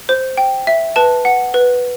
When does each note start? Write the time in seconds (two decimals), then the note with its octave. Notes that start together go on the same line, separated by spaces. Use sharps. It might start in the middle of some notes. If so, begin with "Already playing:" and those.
0.09 C5
0.38 G5
0.67 E5
0.96 B4 A5
1.25 F#5
1.54 B4